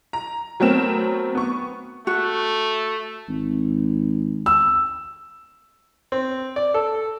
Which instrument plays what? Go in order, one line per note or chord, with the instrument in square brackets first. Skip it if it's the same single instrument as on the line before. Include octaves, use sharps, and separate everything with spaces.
[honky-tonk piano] A#5
F#3 A3 B3 C4 A#4 E7
B3 C#6
[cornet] A3 [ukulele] F#4
[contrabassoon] G#1
[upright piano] E6
[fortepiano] C4
D5
A4